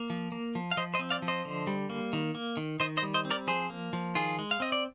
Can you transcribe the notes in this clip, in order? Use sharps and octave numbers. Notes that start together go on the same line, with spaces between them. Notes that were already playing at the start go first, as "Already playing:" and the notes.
Already playing: A#3
F3
A#3
F3
F5
F3 C5 D#5
C5 D#5
C4
D5 F5
F3
C5 D#5
D3
G3
A#3
D#3
A#3
D#3
D#3 C5 D#5
C5 D#5
G3
C5 D#5
C4
A#4 D5
F3 G#4 C5
A#3
F3
D#3 F4 G#4
G#3
F5
C4 D#5
D5